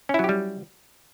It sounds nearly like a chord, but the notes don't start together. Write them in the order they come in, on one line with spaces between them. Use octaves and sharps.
C#4 E4 F#3 G4 G3